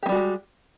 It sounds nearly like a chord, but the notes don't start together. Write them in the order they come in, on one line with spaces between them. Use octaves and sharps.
G4 A#3 G3 F#4 G#3